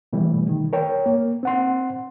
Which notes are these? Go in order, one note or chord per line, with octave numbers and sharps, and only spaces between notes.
B2 E3 G3 A3
D#3
A#4 C#5 G5
A#3
C4 F#5 C6